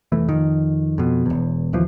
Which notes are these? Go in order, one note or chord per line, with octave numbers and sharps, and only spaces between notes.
F1 E3 A3
F2 D#3
F2 B2
E1 E2
D#1 D#2 E3 F3